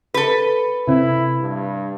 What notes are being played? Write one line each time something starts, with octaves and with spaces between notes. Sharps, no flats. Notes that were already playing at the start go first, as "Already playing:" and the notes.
A4 B4
C3 C4 E4
G2